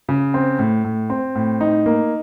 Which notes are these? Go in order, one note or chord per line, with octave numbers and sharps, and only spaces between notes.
C#3
C4
A2
A2
C4
A2
D#4
A#3